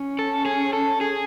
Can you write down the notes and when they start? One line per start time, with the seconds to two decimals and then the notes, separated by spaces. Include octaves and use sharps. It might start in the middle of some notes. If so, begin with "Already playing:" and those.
Already playing: C#4
0.19 A4
0.45 G#4
0.73 A4
1.01 G#4